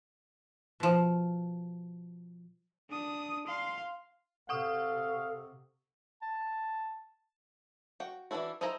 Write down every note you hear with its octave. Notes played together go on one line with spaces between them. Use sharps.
B2 F3
D4 D#6
F5 C6
C3 A4 F5 F#5 C#6 D#6
A5
F#4 G5
E3 G#3 D4 E4 F#4
D#4 E4 C5 G#5 A#5